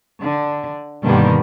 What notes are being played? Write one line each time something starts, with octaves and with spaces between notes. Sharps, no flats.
D3
G2 B2 D3 D#3 G3 A#3